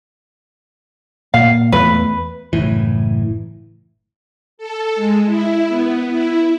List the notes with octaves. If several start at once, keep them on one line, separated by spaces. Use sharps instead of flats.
A#2 F5
E2 A3 B4
F#1 A2 E3
A4
G#3
E4
B3
E4